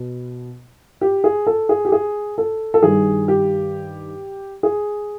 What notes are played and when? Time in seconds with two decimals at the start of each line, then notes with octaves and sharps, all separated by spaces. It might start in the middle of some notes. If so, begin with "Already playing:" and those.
Already playing: B2
1.01 G4
1.24 G#4
1.47 A4
1.69 G#4
1.85 G4
1.92 G#4
2.38 A4
2.74 A4
2.82 G2 D#3 G3 G#4
3.28 G4
4.63 G#4